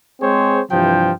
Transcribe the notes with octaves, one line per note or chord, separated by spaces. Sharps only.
G#3 C4 G#4 C5 C#5
G2 C3 E3 F3 G5